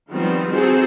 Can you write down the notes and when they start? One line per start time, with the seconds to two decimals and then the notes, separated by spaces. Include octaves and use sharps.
0.11 D#3 F3 G3 B3 C4
0.50 C4 D#4 F#4 G#4 A4 C5